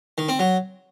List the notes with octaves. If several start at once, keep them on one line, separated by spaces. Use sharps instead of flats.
D#3
C4
F#3